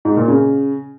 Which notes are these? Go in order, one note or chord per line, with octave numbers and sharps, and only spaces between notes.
G#2
A#2
C#3